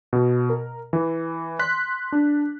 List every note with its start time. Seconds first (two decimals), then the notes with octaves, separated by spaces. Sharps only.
0.13 B2
0.50 A#4
0.93 E3
1.59 C6 F#6 B6
2.12 D4